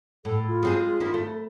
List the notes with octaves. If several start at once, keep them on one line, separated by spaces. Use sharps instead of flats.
A2 A4
F4
G#3 C4 G#4
D#3 A#3 E4
A3